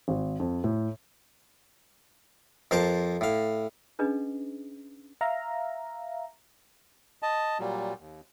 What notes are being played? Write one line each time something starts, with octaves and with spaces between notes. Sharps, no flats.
G#1
F2
A2
F2 A#4 C5 A5 D6
A2 F5
C#4 D4 G#4 B4 D#5
E5 F5 A#5
D#5 A5
A#2 F#3 G3
D#2